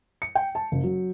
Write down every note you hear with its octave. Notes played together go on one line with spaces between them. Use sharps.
C#7
G5
A5
F#1
F#3